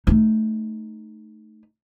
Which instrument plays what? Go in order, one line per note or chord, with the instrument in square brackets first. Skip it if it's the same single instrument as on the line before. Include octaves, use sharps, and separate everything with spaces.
[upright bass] A3 D#4